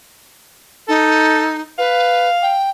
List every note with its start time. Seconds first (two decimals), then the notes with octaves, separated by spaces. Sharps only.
0.89 D#4 A4
1.78 B4 F5
2.42 G5